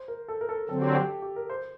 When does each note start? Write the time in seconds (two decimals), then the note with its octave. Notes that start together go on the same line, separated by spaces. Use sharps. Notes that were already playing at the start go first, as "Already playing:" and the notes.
Already playing: C5
0.08 A#4
0.28 A4
0.41 A#4
0.49 A4
0.69 D3 F#3 C4 A4
0.82 G4
0.95 G4
1.22 G4
1.36 A#4
1.50 C5